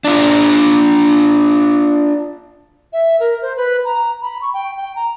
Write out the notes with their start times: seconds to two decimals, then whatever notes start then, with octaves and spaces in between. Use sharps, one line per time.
0.04 D4 F4
2.93 E5
3.20 A#4
3.42 C5
3.57 B4
3.85 A#5
4.22 B5
4.42 C#6
4.54 G5
4.77 G5
4.96 A#5